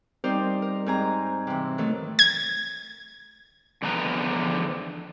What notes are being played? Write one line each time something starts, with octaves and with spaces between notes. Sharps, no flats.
G3 C4 D#4 G4 A#4 C5
A#4
G#2 C4 G#5 A#5
C3 E3
D#3 F#3 A3
G#6
E2 D3 F3 B3 B4 A#5